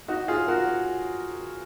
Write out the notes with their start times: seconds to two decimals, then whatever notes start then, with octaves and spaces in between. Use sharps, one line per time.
0.08 D#4 F#4
0.28 F4 G#4
0.47 F#4 A#4